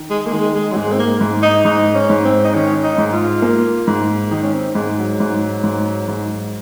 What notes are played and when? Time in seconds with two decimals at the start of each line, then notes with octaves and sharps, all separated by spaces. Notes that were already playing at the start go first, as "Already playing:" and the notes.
Already playing: D#3
0.10 G#3
0.26 A#3
0.32 D#3 G#3
0.55 G#3
0.72 F#3
0.76 G#2 G#3
0.92 C4
0.99 A#3
1.21 G#2
1.43 D#4
1.65 G#2 D#4
1.95 C#4
2.10 G#2
2.25 C4
2.45 D#4
2.54 D#3 C#4
2.83 D#4
2.98 G#2
3.13 F4
3.42 A#3
3.87 G#2
4.31 D#3 D#4
4.43 C#4
4.53 C4
4.75 G#2 G#3
4.98 F#3
5.20 G#2
5.64 G#2
6.08 G#2